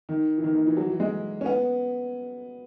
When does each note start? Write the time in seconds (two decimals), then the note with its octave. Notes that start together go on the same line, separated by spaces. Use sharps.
0.09 D#3
0.38 E3
0.44 D#3
0.54 D#3
0.67 E3
0.77 F#3
0.90 E3
1.00 G#3
1.41 C#4
1.46 B3